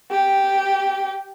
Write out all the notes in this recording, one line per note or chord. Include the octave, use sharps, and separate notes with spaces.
G4